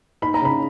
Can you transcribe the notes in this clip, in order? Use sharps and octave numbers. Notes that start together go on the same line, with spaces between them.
D#4 B5
A#5
C#3 B5